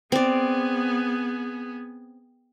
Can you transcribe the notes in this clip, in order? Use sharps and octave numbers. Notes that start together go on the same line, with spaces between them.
B3 C4 G#4 D5